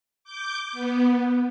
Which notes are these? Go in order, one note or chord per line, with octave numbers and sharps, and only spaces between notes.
D6 G6
B3